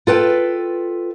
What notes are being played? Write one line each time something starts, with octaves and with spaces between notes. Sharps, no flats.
F4 A4 B4 G5